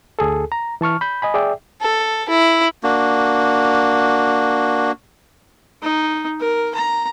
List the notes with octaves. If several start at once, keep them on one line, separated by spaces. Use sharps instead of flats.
D2 G#4 A4
A#5
E3 A5 C#6 F6
B5 G6
D#5 G#5 B5
G#4 D5 E5 G5
A4
E4
A#3 D4 F#4
D#4
A#4
A#5